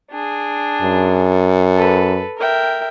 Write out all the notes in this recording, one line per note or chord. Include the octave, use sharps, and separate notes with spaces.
D4 G#4
F#2
A4 B4
A#4 E5 G5